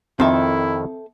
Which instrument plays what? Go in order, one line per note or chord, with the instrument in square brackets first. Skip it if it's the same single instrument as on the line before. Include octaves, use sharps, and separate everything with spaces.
[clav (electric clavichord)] F2 D#3 [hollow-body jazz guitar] C4 A4 E5 [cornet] E4